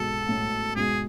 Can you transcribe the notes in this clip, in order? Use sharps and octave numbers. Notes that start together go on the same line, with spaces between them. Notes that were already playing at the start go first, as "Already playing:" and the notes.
Already playing: G#2 B2 A4
A2
G#2 B2 G#4